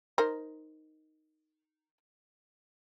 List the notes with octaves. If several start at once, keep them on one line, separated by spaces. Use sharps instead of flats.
D#4 A#4 C5